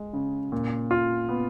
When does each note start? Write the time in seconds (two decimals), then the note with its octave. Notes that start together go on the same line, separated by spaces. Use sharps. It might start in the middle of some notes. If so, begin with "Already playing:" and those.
Already playing: G#3
0.13 C#3
0.52 A#2
0.91 F4
1.29 B3